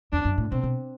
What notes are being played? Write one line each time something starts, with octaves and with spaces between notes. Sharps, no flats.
E2 D4
F#2
A2
B2 C4
B2